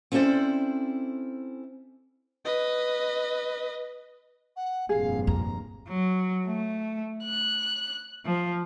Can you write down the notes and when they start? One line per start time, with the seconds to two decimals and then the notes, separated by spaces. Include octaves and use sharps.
0.12 C4 C#4 E4 A4 C5 D5
2.45 B4 D#5
4.56 F#5
4.89 F1 G2 A#2 G#4 F5
5.27 F2 A#5
5.87 F#3
6.46 A3
7.23 F#6
8.25 F3